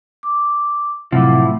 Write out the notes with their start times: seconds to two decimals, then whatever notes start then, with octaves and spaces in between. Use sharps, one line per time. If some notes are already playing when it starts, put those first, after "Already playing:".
0.23 D6
1.12 A2 C3 F3 F#3 E4 D6